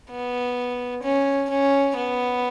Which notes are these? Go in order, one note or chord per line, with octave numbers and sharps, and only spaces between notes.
B3
C#4
C#4
B3